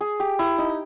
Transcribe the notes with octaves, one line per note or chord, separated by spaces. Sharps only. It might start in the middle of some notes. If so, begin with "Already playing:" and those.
G#4
G4
E4
D#4